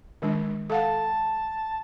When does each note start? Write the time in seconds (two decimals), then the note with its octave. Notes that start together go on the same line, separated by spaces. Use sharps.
0.22 D#3 G#3 D4
0.70 A4 F5 F#5 A5